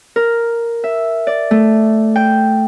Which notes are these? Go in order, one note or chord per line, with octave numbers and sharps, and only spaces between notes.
A#4
E5
D5
A3
G5